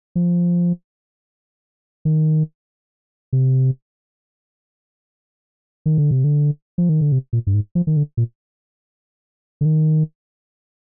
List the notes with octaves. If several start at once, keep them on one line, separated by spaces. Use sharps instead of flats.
F3
D#3
C3
D#3
D3
C3
D3
F3
D#3
D3
C3
A#2
G2
G#2
F3
D#3
D3
A#2
D3
D#3